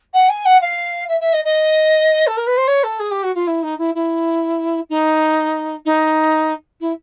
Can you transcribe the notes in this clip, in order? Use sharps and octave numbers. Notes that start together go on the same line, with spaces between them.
F#5
G#5
F#5
F5
E5
E5
D#5
D#5
A4
A#4
B4
C5
C#5
A4
G#4
G4
F#4
F4
E4
D#4
E4
E4
D#4
D#4
E4